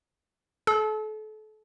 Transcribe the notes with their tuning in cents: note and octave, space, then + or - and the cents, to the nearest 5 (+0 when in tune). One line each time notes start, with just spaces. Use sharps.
A4 -35 A5 +0